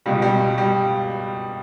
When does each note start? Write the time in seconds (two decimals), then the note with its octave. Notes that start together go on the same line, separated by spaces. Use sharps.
0.06 C#2 B2 G3
0.22 G3
0.58 G3